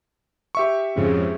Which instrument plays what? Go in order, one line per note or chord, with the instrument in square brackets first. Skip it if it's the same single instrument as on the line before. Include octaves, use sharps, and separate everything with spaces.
[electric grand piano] G4 E5 C#6
[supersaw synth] F2 G#2 C#3